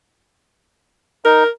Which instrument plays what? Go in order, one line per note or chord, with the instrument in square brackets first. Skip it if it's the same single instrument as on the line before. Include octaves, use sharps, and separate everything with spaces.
[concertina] D#4 [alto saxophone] A#4